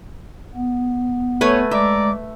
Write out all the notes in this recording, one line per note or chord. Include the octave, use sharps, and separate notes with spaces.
B3
A3 B4 C#5 G#5
G#3 D5 E5 A#5 D6